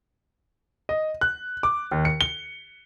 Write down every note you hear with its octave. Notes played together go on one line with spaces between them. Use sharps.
D#5
F#6
D6
D#2
C#7
G7